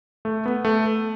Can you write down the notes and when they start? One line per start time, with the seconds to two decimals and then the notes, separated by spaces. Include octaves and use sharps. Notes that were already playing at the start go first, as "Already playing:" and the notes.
0.25 A3
0.45 B3
0.65 A3